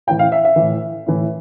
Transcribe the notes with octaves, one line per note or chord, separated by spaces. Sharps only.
A2 E3 G5
F5
E5
E5
A2 E3
A2 E3